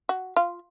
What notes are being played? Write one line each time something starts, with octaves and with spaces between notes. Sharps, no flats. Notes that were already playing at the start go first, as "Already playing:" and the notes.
F#4
F4